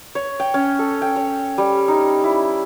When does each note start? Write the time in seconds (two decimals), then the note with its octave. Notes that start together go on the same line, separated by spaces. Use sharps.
0.15 C#5
0.40 G5
0.54 C#4
0.79 A4
1.02 G5
1.16 C#5
1.58 G3
1.88 D#4
2.24 E4